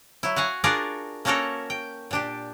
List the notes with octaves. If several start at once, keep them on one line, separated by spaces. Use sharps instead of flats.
F#3 E4
F#4 F5 F#5 G#5
D4 F4 F#4 G#4 A#4 D5
A#3 C#4 F#4 A4 A#4 C#5
G5
A#2 D4 G4